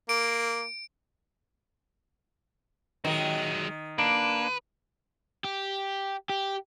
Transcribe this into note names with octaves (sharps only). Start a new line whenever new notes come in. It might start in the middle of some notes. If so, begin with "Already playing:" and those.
A#3 D7
D#3 F#3 G#3
A#3 D4 B4
G4
G4